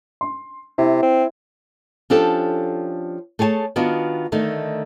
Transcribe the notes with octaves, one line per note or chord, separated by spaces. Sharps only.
C6
C3 E4
C4
F3 C#4 D4 G4 A4
A3 G#4 C#5 G#5 A5
D#3 B3 D4 F4 F#4
D3 D#3 A3 D#4